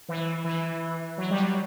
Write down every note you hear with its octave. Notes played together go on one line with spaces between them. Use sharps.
E3
E3
F#3
G3
F#3